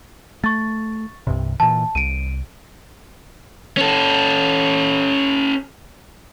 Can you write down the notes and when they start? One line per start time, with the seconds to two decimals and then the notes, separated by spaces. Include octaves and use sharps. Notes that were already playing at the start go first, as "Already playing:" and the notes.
0.44 A3 C#6 A6
1.27 C2 G2 C3
1.60 A#2 E3 A5
1.95 C2 D7 D#7
3.77 C#4 A4